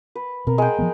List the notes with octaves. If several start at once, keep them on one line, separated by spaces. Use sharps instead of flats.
B4
B2 C4 A#4
G#3 G5
F3 G3 B3